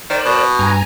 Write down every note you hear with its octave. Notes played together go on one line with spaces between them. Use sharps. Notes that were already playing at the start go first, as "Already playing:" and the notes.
D#3 A#4 C5 D5
B2
G2 G#5 A#5